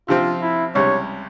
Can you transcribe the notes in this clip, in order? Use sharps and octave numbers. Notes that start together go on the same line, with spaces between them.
C3 F3 C4 F4
E4
C#2 C3 G3 C#5